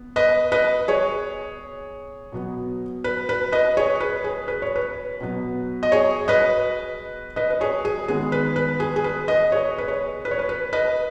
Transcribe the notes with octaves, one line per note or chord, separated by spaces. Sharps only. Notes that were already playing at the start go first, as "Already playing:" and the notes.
Already playing: B3
B4 D#5
B4 D#5
G#4 C#5
B2 F#3 B3
B4
B4
B4 D#5
G#4 C#5
B4
G#4
B4
C#5
B4
B2 F#3 B3
D#5
G#4 C#5
B4 D#5
B4 D#5
B4
G#4 C#5
G#4
D#3 G#3 B3 G#4
B4
B4
G#4
G#4
B4
B4 D#5
G#4 C#5
B4
G#4 C#5
B4
C#5
B4
B4
B4 D#5